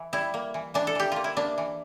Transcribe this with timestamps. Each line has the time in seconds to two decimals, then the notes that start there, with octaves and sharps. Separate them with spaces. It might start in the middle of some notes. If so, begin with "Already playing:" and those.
Already playing: E3
0.13 G3 E4
0.34 A#3
0.54 E3
0.74 E3 D4
0.87 A4
0.95 E3 G4
1.12 A#3 F4
1.24 E4
1.36 A#3 D4
1.58 E3